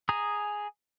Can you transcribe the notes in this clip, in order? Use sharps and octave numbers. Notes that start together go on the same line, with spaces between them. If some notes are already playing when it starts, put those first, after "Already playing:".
G#4 G#5 A#5 D#6